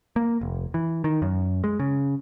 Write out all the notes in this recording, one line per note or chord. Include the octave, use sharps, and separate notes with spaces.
A#3
F1
E3
D#3
F#2
G#3
C#3